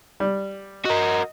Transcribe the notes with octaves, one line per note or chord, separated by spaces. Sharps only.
G3
F#4 A#4 D#5